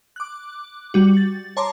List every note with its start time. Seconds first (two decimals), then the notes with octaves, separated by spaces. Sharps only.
0.16 D6 F#6
0.94 G3 F#4
1.17 A6
1.57 C#5 A5 A#5 C6 D6